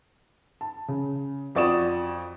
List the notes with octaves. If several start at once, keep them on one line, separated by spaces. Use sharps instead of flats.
A5
C#3
F2 F#4 D5 C#6 D#6 E7